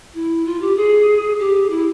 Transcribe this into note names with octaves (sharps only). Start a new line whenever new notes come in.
E4
F4
G4
G#4
G4
E4